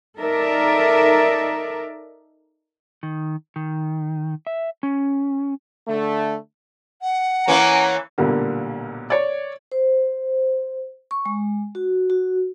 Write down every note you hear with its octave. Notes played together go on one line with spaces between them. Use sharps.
D#4 A4 A#4 D5 E5
D#3
D#3
E5
C#4
D3 A3
F#5
E3 A#3 C#4 A#5
B1 A#2 D3 G3 A#3
C#5 D5
C5
C#6
G#3
F#4
F#4